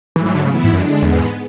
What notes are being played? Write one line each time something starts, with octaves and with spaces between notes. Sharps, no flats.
G#2 E3 F#3 A3
E3
D3
C#3 E3 B3 E4
G#2
F#2 D3 G#3 D4
E2 G#2 G#3 B3